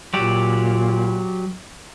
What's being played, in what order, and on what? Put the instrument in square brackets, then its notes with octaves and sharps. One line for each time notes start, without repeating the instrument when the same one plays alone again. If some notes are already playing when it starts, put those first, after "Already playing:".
[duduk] A#2 [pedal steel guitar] F#3 G4 D5